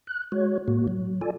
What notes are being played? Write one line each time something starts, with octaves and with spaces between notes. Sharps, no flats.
F#6
G#3 F#4 C#5
A2 A#3 F#4
F#3
F4 A4 D5 G#5